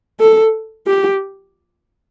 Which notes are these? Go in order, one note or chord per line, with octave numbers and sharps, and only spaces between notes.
A4
G4